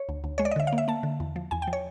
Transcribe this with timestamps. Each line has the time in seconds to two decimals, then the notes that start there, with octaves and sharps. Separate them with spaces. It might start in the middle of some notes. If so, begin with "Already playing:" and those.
Already playing: C#5
0.09 D2
0.24 D2
0.38 G#3 C#5
0.45 D5
0.51 D#5
0.56 D3 E5
0.67 F5
0.72 A#3
0.78 E5
0.88 A#3 A5
1.03 D3
1.20 E2
1.36 F3
1.51 E2 G#5
1.62 G5
1.67 F3
1.73 C#5